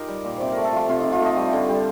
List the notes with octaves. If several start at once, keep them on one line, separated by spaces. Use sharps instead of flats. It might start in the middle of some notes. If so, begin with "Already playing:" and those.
Already playing: D#4 F4 G4 A#4
G3
A#2
C3 C5 D5
A3 A#4
A4
F3 F4
C3 F4
C3 D#4
F4
A3 D#5
G3
D3
G3